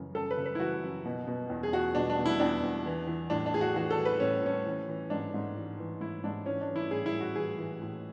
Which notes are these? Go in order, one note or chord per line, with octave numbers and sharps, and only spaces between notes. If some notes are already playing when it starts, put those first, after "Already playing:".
Already playing: F#2 C#3 E3
F#2 A4
B4
C#3
B4
E4
E3 F#4
F#2
B2
B2
E2
G#4
E2 F#4
B2 D4
D4
B2
E4
E2 D4
E2
E3
E3
A2 D4
D4
A2 G#4
F#4
E3 F#4
A4
E3
B4
A2 C#4
A2 C#4
E3
E3
G#2 D4
G#2
E3
E3
G#2 E4
G#2 D4
E3 C#4
D4
E3
E4
A2 G#4
E4
A2
F#4
E3 G#4
E3
A2